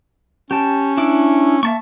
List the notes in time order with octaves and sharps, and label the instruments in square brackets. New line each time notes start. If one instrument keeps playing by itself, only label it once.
[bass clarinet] C#4 [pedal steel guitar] G4 A5
[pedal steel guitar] D4 E4 D6
[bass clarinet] A#3 [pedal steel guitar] E5 A5 C#6